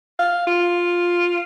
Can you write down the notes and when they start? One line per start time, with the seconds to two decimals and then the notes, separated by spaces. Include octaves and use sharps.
0.19 F5
0.47 F4